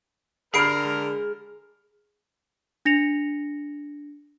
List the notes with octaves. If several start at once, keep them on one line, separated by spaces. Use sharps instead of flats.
D3 G#4 A#4 B5 F6 C7 D7
G#3
D4 A#6 C#7 F7